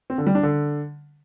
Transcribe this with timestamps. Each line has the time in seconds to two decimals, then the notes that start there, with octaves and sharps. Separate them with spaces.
0.10 C4
0.18 D3
0.26 G3
0.35 D4
0.43 D3